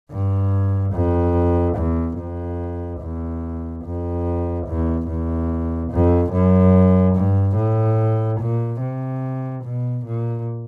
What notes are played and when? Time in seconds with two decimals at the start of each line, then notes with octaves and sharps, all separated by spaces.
0.11 G2
0.93 F2
1.77 E2
2.18 F2
3.01 E2
3.84 F2
4.67 E2
5.08 E2
5.91 F2
6.33 F#2
7.15 G2
7.57 A2
8.40 A#2
8.81 C3
9.64 B2
10.05 A#2